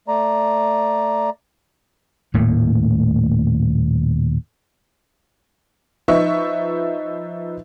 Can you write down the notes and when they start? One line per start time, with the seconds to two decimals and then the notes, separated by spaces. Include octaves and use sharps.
0.08 A3 D5 A#5
2.34 D#1 A2 A3 A#3
6.08 F3 D#4 B4 E5 C#6